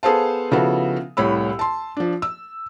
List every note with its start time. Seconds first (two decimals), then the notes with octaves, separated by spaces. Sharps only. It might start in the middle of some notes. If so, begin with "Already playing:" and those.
0.03 B3 G#4 A4 C5 F5 A5
0.52 C#3 F3 B3 E4 F#4 A4
1.17 C2 A2 C#5 B5 E6
1.59 A5 C6
1.97 F3 D4
2.22 E6